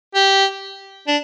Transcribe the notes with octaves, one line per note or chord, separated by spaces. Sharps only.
G4
D4